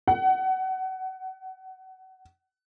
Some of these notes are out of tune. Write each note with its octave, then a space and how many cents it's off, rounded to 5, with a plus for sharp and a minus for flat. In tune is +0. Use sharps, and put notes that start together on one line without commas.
F#5 +25